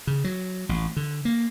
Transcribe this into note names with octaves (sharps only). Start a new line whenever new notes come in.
C#3
F#3
A1
D3
A#3